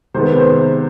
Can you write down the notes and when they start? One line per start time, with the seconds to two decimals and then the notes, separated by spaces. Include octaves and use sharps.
0.14 C3 D#3 G#3 B3 C5
0.27 B4
0.40 C5